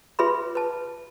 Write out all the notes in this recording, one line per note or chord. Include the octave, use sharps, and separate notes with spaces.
F4 G#4 B4 E5 B5 C6
B4 A5